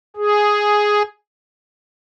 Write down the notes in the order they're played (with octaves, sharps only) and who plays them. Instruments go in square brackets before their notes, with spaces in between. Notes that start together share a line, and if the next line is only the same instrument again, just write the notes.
[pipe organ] G#4